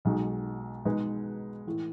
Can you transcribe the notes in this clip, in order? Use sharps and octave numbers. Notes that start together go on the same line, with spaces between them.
B1 B2 G#3 D#4 F#4
B2 G#3 D#4 G#4 B4
A2 E3